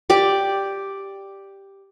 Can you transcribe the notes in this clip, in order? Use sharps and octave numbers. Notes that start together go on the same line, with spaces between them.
G4 D5 D6